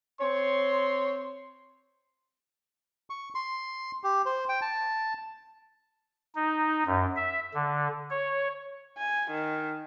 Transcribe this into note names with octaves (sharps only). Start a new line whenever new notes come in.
C4 C#5 C6
C#6
C6
G4
C5
G5
A5
D#4
F#2
E5
D3
C#5
G#5
D#3